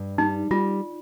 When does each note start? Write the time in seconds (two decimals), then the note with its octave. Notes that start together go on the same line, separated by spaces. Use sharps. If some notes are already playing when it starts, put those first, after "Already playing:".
Already playing: G2
0.18 G3 D#4
0.51 G3 F4